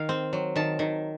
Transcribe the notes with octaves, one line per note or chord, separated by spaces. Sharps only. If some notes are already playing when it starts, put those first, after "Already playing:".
Already playing: D#3 F5
C4
F#3
D#3 A5
D#3